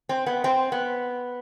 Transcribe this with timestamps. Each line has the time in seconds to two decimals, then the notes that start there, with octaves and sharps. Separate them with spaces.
0.09 C4
0.26 B3
0.44 C4
0.72 B3